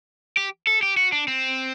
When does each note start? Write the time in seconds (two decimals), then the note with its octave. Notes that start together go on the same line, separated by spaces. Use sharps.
0.37 G4
0.67 A4
0.83 G4
0.97 F#4
1.12 D4
1.28 C4